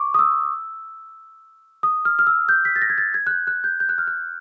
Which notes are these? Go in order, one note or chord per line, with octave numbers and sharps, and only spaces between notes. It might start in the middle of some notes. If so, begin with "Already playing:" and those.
Already playing: C#6 D6
D#6
E6
D#6
F6
F6
E6
G6
B6
A6
A#6
G#6
A6
G#6
F#6
G6
F#6
G6
G6
F#6
F6
F#6